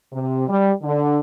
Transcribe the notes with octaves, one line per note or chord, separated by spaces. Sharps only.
C3
G3
D3